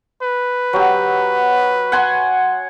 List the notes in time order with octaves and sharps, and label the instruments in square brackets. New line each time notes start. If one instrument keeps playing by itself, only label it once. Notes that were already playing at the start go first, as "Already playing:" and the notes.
[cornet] B4
[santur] F#3 G4
F#5 G#5 C6